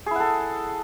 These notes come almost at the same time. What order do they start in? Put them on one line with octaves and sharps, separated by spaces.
G#4 E4 F#5 A4